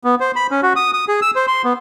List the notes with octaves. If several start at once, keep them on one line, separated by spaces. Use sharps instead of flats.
B3
C5
B5
C#4
F#4
D#6
D#6
G#4
E6
C5
C6
B3